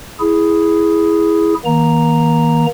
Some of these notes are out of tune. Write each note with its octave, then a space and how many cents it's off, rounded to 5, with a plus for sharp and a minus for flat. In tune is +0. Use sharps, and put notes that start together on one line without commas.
E4 +0 G#4 +0
D#3 +35 A#3 +25 A#5 +0